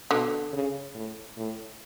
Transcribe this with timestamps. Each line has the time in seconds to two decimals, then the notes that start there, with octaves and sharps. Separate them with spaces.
0.11 B2 D3
0.53 C#3
0.95 A2
1.37 A2